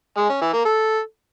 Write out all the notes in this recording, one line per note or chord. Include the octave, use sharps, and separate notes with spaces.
G#3
C#4
E3
A#3
A4